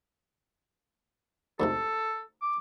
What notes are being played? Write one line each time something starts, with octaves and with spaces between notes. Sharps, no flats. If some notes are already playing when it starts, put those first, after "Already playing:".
D2 G#2 C3 A4
D6